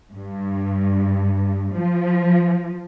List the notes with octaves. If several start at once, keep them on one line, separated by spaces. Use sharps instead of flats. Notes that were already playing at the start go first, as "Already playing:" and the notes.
G2
F3